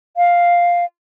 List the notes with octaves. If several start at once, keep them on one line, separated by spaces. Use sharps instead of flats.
F5